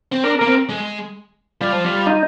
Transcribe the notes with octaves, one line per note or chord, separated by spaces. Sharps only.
C4
D4 A#4
A#3 A#4
C4
G#3
G3 F4
F3
G3
D#4